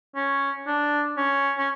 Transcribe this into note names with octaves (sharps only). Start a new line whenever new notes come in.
C#4
D4
C#4
C#4